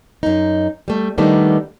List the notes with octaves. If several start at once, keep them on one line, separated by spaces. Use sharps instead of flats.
F#2 D#4
G3 A3
D#3 G3 A3 B3 D4 D#4